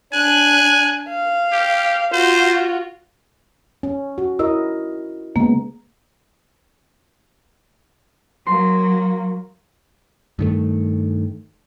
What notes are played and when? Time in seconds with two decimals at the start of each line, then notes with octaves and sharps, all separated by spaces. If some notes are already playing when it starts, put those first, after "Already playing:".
0.13 D4 G#5 F#6
1.09 F5
1.52 G4
2.13 F4 F#4 C5
3.83 C#4
4.18 F#4
4.39 E4 A#4 D#5 E6
5.36 C#3 G#3 A#3 B3
8.47 F#3 A#3 C6
10.39 G2 D#3 A3